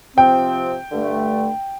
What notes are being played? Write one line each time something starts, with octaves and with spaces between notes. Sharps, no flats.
C3 F3 C4 G5
G2 D3 A3